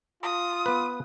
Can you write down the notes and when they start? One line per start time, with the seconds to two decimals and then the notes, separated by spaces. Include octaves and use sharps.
0.23 F4 D#6
0.66 B3 B4